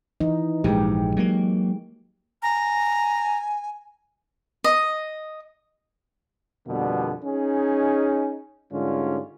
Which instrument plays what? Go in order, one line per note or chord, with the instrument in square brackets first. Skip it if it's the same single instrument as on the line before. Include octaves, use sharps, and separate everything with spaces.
[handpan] E3 D#4
[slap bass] A#1 G#2 [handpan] G#3 G4
[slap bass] F#3 A#3
[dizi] G#5 [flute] A#5
[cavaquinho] D#5
[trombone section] F2 B2 D3 G3 A#3 B3
C#4 D#4 G#4
G#2 D3 G3 G#3 C#4 F4